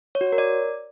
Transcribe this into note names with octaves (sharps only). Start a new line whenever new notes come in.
C#5
F#4
C#5
A#4
D5